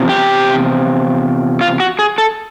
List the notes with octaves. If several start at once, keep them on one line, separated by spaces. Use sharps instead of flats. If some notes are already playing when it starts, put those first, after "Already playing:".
Already playing: E2 C3 F3
G4
F4
F#4
G#4
A4